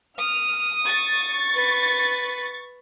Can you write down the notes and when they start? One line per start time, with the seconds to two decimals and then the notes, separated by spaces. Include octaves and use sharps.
0.19 D#6 F6
0.87 C#6 A6 C#7
1.55 B4